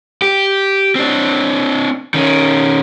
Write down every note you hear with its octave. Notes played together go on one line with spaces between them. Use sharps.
G4
C4 D4
D#3 C#4